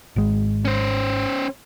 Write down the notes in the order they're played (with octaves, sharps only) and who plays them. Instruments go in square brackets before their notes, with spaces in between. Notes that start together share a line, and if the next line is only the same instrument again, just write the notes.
[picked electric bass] G#1 G#3
[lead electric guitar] C#4 C5